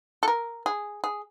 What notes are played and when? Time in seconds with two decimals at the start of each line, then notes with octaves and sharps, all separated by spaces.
0.23 A4
0.28 A#4
0.66 G#4
1.04 G#4